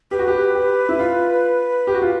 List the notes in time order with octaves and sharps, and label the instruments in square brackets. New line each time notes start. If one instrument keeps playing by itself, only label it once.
[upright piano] G4 [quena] B4
[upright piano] F#4
G4
G4
E4
F4
G4
F#4
F4